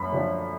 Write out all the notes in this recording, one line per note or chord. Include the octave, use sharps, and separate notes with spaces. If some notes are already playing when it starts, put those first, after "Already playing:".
Already playing: F#2 B5
D3 F3